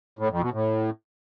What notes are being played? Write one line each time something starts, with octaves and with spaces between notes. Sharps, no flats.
A2
F2
B2
A2